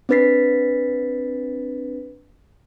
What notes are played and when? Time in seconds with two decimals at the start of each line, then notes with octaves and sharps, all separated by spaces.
0.09 C4 D4 B4 A6 B6 C7